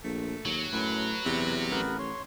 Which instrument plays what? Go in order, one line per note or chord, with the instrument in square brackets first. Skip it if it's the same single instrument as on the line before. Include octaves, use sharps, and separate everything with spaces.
[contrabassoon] A#1 [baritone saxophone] A3
[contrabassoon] D#2 [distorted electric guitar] F#3
[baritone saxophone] F#2 [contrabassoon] A2 [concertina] B4
[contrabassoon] E2 [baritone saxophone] C3
[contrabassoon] A1 [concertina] B3 A#4 B4
[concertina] C#5 C6